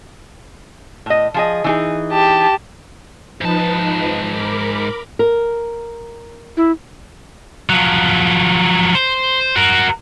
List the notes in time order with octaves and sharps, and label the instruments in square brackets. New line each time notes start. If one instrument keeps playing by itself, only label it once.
[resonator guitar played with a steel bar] A2 D#5
F3 G#4 D#5
E3 D#4 G#4
[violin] G4 A5
[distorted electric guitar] G#2 A5 [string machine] F3 D#4 B4
[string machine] A#4 B5 D6
[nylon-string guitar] A#4
[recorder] E4
[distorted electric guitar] F3 F#3
C5
F#4 A#4